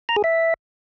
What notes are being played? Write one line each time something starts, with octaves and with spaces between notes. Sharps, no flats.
A#5
G#4
E5